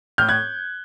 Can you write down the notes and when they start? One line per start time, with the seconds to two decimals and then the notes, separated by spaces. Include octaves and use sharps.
0.18 A2 F6 G6
0.29 F#6 G#6